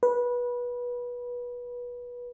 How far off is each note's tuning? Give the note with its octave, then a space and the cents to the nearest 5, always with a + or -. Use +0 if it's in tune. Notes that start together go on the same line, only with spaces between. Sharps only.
B4 -20